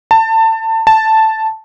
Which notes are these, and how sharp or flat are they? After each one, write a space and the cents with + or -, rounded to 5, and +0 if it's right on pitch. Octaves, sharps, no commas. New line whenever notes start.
A5 +25
A5 +0